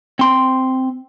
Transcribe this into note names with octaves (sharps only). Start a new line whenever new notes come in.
C4 C6